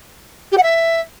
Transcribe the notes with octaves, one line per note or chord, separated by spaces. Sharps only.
G4
F#5
E5